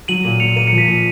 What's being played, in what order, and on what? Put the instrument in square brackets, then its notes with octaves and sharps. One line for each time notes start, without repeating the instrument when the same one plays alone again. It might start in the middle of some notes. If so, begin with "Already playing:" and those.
[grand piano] F#3 [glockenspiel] D#7 F#7
[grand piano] A#2
[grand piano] A#2 [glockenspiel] C#7 F7
[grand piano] A#3 [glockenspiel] D#7
[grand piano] F3 [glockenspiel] C#7
[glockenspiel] B6 D#7
[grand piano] A#2